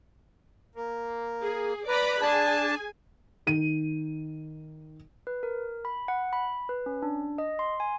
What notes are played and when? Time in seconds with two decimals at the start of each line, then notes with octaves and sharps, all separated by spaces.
0.76 A#3
1.42 G#4
1.88 B4 D5 A#5 B5
2.22 D4 G#4 G#5 A5
3.47 D#3 D#7
5.27 B4
5.43 A#4
5.85 B5
6.08 F#5
6.33 B5
6.69 B4
6.86 C#4
7.02 D4
7.38 D#5
7.59 C6
7.80 G#5